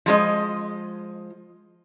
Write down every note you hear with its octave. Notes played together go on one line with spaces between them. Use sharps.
F3 G#3 D#5